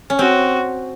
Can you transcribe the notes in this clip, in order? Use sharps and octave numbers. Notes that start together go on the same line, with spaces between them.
C#4
C4 F#4